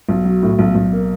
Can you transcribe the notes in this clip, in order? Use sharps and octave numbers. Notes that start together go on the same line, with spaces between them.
B1
F#3
A2
B1
B1
A#3